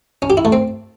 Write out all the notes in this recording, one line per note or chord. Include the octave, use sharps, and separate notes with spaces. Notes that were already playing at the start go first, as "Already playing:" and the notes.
C#4
G4
E4
A3
C4